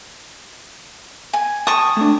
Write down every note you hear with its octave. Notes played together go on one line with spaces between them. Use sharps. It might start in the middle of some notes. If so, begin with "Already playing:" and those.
G#5
G5 A5 C#6 D#6
A3 D4